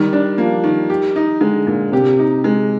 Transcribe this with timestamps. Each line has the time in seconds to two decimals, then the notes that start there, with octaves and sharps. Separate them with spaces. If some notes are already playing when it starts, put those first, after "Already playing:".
Already playing: D#3 G3
0.13 D4
0.38 F3 A#3
0.64 D#3
0.90 G4
1.16 D#4
1.41 D3 G#3
1.67 A#2
1.92 C3 G4
2.19 D#4
2.44 G#3